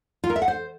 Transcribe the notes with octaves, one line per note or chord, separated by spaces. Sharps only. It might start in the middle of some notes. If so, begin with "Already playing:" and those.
F4
A#4
E5
F#5
C5